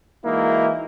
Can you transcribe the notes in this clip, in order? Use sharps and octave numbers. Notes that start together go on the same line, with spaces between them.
E3 G#3 A#3 D#4 E4 F#4